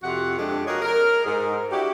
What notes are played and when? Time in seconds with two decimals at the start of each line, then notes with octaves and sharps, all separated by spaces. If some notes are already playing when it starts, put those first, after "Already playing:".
0.03 F2 C3 F4 F#4 F#5
0.37 F2 G#3 D4 G4 A4 D#5
0.66 F#4 G#4 A#4 C#5 D#5
0.82 A#4
1.24 G#2 G#4
1.70 D4 E4 F#4 G4